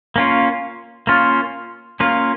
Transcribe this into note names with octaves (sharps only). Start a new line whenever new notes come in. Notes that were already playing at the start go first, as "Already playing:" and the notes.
A#3 C#4 F4
A#3 C#4 F4
A#3 C#4 F4